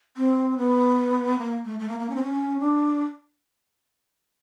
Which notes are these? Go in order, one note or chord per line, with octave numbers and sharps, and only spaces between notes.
C4
B3
A#3
A3
A3
A#3
A#3
C#4
C4
C#4
D4